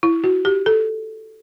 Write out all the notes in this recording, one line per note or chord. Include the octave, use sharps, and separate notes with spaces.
E4
F#4
G4
A4